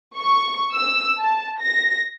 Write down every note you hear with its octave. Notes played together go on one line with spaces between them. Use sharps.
C#6
E6
A5
A#6